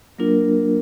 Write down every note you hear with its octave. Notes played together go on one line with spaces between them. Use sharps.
F#3 A#3 D4 F4 A#4